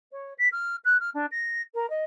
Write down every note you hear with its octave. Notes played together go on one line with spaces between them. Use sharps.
C#5
B6
F6
F#6
F6
D4
A#6
A#4
D#5